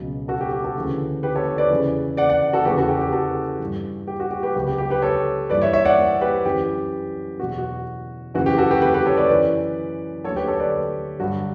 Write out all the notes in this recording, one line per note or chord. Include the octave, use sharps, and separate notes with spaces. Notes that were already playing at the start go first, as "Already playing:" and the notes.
Already playing: C#2 B2 F#3
F#4 A4
G4
G4
F#4 A4
D2 C#3 E3
G4 B4
A4 C#5
B4 D5
E2 C#3 E3
D5 F#5
D5 F#5
F#4 A4
E2 C#3 E3 G4 B4
F#4 A4
G4
G4
F#4 A4
G2 E3
G4
F#4
G4
G4 B4
C#2 C#3 F#3 G4
G4
G4
G4 B4
A4 C#5
G2 E3 B4 D5
C#5 E5
C#5 E5
D5 F#5
G4 B4
F#2 E3 G4
E2 B2 F#3 F#4
F#4
F#2 C#3 E3 F#4
G4
F#4 A4
G4 B4
G4 B4
G4 B4
A4 C#5
B4 D5
F#2 E3 B4 D5
D2 D3 F#3 A4 C#5
G4 B4
A4 C#5
B4 D5
G2 D3 F#3 F#4